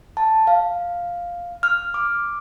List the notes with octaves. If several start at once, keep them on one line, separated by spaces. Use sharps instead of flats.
A5
F5
F6
D6